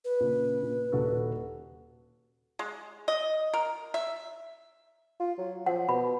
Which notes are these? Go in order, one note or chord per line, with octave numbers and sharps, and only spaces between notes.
B4
A#2 C#3
A#2
D#1 F#4 A4
G#3
D#5
A#4
E5
F4
F#3
F3 F#5
B2 B5